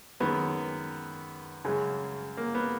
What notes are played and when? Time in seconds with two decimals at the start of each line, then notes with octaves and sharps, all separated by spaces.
0.20 F#2 D#3 G#3 B3
1.65 F#2 C#3 G#3
2.37 A#3
2.55 B3